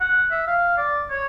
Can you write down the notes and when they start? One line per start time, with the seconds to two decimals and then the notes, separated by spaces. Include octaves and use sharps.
0.01 F#5
0.31 E5
0.47 F5
0.78 D5
1.11 C#5